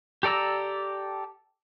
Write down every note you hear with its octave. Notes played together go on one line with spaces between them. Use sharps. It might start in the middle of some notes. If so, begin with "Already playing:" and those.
G4 A4 D5 A#5 E6